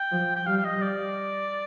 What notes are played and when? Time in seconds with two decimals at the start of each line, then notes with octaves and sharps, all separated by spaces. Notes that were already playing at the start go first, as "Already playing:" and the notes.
Already playing: G5
0.12 F3
0.36 G5
0.46 G3 F5
0.58 F5
0.64 D#5
0.82 D5